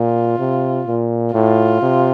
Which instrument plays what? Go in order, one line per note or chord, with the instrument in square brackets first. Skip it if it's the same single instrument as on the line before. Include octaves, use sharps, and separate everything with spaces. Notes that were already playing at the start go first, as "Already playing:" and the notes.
Already playing: [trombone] A#2 [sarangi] F4
[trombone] C3
A#2
[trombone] A2 [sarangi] F4
[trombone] C3